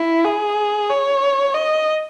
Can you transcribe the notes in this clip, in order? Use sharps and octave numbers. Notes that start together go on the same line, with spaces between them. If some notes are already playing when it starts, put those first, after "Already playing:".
Already playing: E4
G#4
C#5
D#5